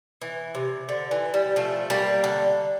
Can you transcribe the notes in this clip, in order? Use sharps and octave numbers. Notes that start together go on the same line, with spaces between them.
E3
C3
D3
E3
G3
F3 A3
G3 A#3
D3